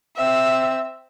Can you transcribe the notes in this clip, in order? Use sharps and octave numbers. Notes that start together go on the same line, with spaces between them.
C4 E5